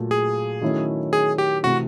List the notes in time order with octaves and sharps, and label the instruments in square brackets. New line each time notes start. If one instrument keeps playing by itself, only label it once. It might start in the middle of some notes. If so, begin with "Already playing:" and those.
Already playing: [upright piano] A#2 F#3 A3
[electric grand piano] G#4
[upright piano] D#3 F#3 A3 C#4 E4
[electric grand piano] G#4
G4
[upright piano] C3 E3 A3 C4 [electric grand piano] F#4